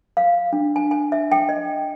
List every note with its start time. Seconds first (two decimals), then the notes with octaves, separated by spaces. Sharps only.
0.17 F5
0.53 D4
0.76 G#5
0.91 G#5
1.12 E5
1.32 G5
1.49 D#5